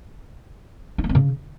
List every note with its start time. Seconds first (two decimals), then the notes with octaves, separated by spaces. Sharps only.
0.98 D4
1.04 A#3
1.09 C4
1.15 C#3